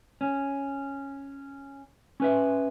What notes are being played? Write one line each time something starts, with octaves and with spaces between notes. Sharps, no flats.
C#4
C#4 B4 E5